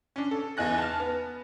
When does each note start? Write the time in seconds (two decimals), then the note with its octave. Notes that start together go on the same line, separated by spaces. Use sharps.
0.16 C#4 D4
0.31 A4
0.57 E2 D#4 G#5 F#6 A#6
0.78 A5 F6
1.00 B3